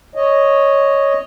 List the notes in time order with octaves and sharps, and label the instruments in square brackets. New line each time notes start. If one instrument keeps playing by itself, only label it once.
[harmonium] C#5 D#5